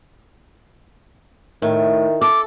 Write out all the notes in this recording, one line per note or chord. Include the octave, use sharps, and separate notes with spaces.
A2 D#3
A4 D6